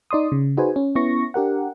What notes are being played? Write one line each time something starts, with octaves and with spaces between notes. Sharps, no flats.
D#4 D5 C6 D#6
C#3
D#4 F#4 G#4 B4 C5 G#5
C#4
B3 C#4 E4 C#6 A#6
D4 G4 A#4 F#5